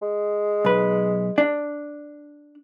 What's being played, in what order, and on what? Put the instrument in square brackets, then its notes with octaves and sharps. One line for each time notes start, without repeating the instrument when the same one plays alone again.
[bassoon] G#3
[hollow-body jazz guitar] B1 B4
D4